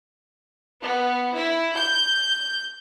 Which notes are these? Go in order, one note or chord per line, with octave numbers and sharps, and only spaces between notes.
B3
E4
G6